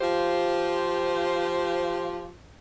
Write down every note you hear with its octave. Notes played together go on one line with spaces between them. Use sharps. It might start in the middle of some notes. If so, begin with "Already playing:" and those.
F3 F4 G4 C5